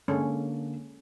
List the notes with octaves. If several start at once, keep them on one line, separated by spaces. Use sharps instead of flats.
D3 G#3 A#3 C#4 A4